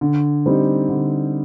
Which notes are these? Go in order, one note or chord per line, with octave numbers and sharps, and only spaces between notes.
D3
G3 C4 D#4
D3